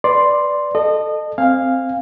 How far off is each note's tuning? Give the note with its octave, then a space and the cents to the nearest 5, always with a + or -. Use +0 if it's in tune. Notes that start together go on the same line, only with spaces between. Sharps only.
B4 +0 D5 +0 C6 +0
A4 +0 D#5 -30
C4 +0 F5 +0 G#5 -25